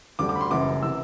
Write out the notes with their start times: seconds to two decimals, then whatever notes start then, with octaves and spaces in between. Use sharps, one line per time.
0.19 D2 D3 G3 D6
0.29 D6
0.36 B5
0.41 C6
0.51 F#1 F#2 E3 D6
0.83 C3 E3 E6